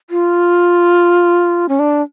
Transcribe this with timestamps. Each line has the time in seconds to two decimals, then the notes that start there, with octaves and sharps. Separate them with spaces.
0.10 F4
1.69 C#4
1.79 D4